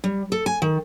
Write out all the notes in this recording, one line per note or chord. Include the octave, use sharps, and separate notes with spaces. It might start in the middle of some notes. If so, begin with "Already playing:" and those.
G3
A4
G#5
D#3